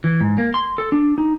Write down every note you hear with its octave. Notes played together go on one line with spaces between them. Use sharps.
E3
G#2
A#3
C6
A4
D4
D#4